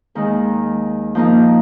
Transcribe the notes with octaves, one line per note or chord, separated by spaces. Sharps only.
D#2 D#3 G#3
F3 A#3 D#4